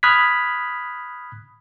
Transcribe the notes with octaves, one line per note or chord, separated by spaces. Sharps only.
B5 D#6 F6 F#6 G#6 B6